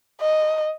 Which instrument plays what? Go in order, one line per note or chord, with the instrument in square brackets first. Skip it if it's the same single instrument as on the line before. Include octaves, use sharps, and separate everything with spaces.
[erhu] D#5